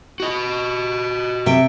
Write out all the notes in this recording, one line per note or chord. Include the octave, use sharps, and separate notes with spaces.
F#4 D#5
C3 E5 G5